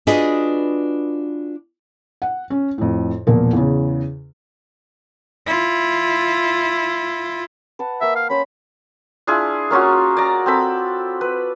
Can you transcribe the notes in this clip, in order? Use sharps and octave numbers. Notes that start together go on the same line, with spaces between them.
D4 F4 F#4 G#4 B4 D#5
F#5
C#4
F2 A2
E1 A#2 F3 A#4
E2 C#3
E4 F4
B4 F#5 A5
A#3 E5 F#5
F5
C#4 C5 F5 B5
D4 E4 F4 G#4
A#3 C#4 F4 F#4
D5 A#5
C4 A4 B5
B4